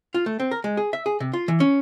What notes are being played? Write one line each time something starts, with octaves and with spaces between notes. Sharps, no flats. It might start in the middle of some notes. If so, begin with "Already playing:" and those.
F4
A3
C4
A#4
G#3
G#4
E5
G#4
C3
F4
E3
C#4